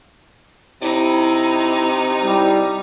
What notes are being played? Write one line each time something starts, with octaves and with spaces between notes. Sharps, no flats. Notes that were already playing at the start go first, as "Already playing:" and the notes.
C3 D#4 E4
G3 E4